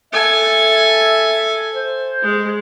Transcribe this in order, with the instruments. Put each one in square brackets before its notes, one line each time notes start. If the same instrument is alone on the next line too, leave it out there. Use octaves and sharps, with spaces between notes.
[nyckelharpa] A4 G#5 [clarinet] E5
[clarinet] C5
[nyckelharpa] G#3